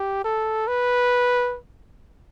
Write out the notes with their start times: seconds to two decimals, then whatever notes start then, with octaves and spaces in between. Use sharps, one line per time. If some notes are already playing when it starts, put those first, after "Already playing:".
Already playing: G4
0.24 A4
0.67 B4